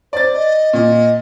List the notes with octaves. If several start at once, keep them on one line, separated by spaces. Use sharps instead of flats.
C5 D5 A6
D#5
A#2 D#5